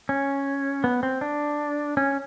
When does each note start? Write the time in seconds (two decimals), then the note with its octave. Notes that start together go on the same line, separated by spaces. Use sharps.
0.09 C#4
0.84 B3
1.03 C4
1.21 D4
1.97 C#4